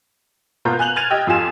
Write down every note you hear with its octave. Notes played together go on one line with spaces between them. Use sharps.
B2 A#3 F4 B4 A#5 G6
G#5 F#6 F7 F#7
F6 G#6 A6 D#7 F7
G4 D#5 G5 E6
F2 F4 G4 G#5 E7